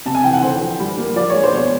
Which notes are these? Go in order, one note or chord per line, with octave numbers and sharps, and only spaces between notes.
C3 A5
G#5
E3 G5
F#5
D3 C5
F3
G3
A#3
F3 D5
G#3 C#5
C5
B2 C#5